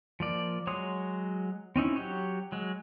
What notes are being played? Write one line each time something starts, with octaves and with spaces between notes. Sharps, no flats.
F3 A#3 D5
F#3 G#3 C#5 C6 D#6
C4 C#4 D#4 E4
F#3 G4 C#5
F#3 G#3